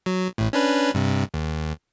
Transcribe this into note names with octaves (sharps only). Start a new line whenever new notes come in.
F#3
A1 A2
C#4 D4 B4
G2 C3
D#2